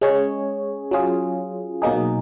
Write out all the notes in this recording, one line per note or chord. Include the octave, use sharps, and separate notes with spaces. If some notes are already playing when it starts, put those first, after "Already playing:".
G#3 C#4 G#4 C#5
F#3 C#4 F4 G#4
B2 F#3 A#3 D#4 G#4